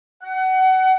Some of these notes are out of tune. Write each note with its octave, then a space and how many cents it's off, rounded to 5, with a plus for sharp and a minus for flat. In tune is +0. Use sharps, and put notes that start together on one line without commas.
F#5 +25